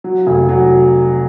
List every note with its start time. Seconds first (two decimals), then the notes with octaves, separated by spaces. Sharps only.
0.04 F#3
0.27 F1
0.49 F#3